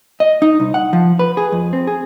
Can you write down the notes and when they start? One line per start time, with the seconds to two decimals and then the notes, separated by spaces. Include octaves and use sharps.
0.20 D#5
0.42 D#4
0.60 C2
0.74 F#5
0.93 F3
1.19 B4
1.37 G#4
1.52 F2
1.73 C4
1.87 G#4